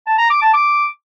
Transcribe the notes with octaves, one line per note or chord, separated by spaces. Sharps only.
A5
A#5
D6
A5
D6